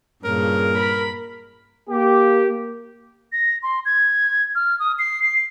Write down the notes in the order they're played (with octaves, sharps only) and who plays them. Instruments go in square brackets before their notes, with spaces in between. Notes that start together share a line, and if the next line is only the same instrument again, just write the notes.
[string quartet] G2 A#2 C#3 [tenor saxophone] A#4
[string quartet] B5
[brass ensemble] A#3 G4
[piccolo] A#6
C6
G#6
F6
D#6
C7
C7